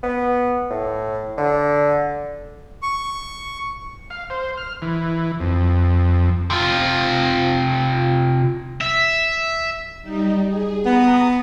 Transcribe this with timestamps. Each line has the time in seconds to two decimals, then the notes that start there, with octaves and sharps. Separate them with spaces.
0.03 B3
0.70 A2
1.38 D3
2.83 C#6
4.10 F5
4.30 C5
4.57 F6
4.82 E3
5.40 F2
6.50 C3 F4
8.81 E5
10.02 G3 D#4
10.47 G#4
10.85 B3 A#5 D#6